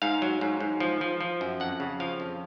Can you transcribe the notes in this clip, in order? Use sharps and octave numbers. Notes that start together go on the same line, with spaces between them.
G#2 F5
F#3
G#2
G#2
F3
F3
F3
F#2
F2 F#5
C#3
F3 F5
F2